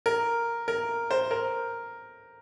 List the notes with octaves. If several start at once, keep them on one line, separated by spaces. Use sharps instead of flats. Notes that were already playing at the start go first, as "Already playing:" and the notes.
A#4
A#4
C5
A#4